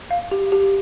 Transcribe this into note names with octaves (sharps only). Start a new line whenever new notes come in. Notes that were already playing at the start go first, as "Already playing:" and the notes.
F5
G4
G4